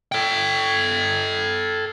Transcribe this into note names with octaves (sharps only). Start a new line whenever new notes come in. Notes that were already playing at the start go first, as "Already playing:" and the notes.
A4 G5